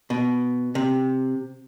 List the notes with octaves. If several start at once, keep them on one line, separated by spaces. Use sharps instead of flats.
B2
C3